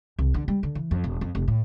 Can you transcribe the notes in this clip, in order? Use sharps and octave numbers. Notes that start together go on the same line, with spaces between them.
C2
D3
G3
D3
E3
F2
E1
F2
F1
A2